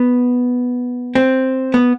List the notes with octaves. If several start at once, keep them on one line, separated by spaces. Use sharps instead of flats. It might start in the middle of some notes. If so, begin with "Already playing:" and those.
Already playing: B3
C4
B3